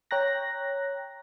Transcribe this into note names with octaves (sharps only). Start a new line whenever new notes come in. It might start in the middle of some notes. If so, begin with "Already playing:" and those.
C#5 G5 A#5 F#6 A#6